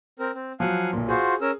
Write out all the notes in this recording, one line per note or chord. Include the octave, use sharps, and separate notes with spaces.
C4 A#4
C4
F3 F#3 F5 F#5 G#5
B1 A#2
F4 F#4 G#4 C5
C#4 A#4 E6